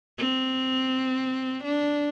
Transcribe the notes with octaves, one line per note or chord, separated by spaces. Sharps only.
C4
D4